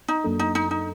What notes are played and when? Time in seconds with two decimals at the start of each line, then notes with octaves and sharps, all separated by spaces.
0.08 D#4
0.24 F#2 F#3 A#3 D4 A4
0.39 D#4
0.55 D#4
0.71 D#4